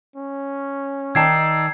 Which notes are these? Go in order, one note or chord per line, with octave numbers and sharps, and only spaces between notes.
C#4
D#3 D#4 D5 G5 A5 E6 G#6 C7